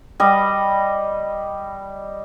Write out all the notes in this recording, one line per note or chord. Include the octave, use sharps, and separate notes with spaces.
G3 D#5